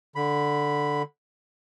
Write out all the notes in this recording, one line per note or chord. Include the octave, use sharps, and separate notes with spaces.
D3 B5